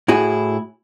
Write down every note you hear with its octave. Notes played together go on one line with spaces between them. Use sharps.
A2 E4 F#4 G#4